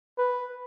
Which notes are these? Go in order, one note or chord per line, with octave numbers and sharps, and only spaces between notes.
B4